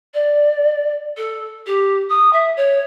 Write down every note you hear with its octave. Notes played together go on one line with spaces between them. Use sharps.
D5
A4
G4
D#6
E5
C#5